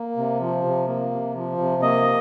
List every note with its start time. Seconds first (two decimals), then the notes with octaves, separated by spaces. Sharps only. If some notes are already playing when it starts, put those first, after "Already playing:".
Already playing: A#3
0.16 C3
0.40 F3
0.64 C3
0.88 A#3
1.11 C3
1.35 F3
1.58 C3
1.82 A#3 D#5